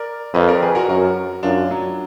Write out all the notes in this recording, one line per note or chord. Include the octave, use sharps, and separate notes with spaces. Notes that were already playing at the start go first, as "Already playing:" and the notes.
Already playing: A#4 D5
F2 B4 D#5
A#4 D5
G#4 B4
F#4 A#4
F#2 F#4 A#4
F#2 D4 F4
F#3